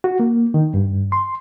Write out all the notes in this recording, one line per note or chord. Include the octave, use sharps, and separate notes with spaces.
F#4
A#3
D#3
G2
C6